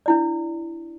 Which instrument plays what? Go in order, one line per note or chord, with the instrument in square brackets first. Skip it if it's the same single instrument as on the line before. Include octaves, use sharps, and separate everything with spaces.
[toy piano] D4 E4 D5